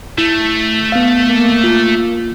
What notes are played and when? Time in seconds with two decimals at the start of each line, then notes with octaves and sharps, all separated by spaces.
0.18 A3 E4
0.92 B3 F5
1.28 A#3
1.64 F4